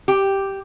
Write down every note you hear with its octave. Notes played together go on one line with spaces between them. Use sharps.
G4